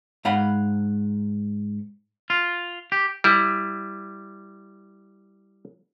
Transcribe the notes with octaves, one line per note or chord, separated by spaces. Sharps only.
G#2 F5 F#5 B5
F4
G4
G3 E4